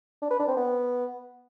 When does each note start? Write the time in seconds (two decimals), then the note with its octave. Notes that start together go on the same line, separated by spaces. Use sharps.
0.22 D4
0.31 B4
0.39 D4
0.48 C4
0.57 B3